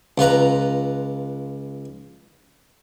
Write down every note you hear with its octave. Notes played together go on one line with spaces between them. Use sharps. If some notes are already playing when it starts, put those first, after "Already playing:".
C#2 F4 B4 A#5